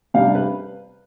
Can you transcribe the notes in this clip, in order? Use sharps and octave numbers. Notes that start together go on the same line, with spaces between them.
C3 G3 D4 F5
B4